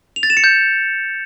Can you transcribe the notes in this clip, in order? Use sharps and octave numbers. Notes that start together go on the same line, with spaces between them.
F7
A6
E7
C#7
G6